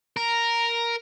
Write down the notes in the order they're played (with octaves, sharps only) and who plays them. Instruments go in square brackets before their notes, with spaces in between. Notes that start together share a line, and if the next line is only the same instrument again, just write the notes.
[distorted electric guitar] A#4